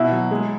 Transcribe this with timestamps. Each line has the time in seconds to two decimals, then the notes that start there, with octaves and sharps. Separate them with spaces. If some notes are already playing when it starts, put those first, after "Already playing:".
Already playing: B2 E4
0.12 F#3
0.31 G#3